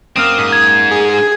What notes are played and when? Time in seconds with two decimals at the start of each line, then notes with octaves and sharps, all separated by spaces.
0.16 F#2 A#3 C4 F5 D#6
0.38 G#2
0.53 G#6
0.91 G#4